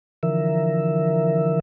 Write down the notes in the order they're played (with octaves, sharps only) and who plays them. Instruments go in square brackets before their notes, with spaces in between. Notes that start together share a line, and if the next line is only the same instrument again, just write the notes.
[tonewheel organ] D3 E3 F3 A#4 E5